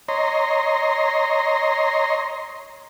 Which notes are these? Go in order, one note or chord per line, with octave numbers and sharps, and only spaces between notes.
C#5 D#5 A#5 C6